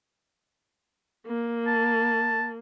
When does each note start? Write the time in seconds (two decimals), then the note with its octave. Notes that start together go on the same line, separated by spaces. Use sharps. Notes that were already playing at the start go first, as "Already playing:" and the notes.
1.27 A#3
1.67 A5